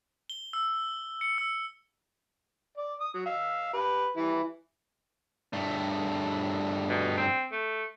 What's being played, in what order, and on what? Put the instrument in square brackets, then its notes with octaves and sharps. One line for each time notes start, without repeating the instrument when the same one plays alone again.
[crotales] G7
E6
C#7
E6
[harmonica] D5
D#6
F#3
F5 E6
G4 B4
E3 G3 E4
[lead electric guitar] G2 A3
[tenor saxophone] B2
C4
A3